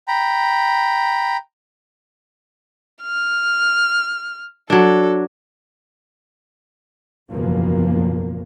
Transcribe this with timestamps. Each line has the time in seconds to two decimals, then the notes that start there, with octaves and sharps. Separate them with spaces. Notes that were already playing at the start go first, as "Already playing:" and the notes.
0.08 G5 A#5 B5
3.02 F6
4.70 F#3 D4 A4
7.31 F#1 B1 E2 B2 F3 A#3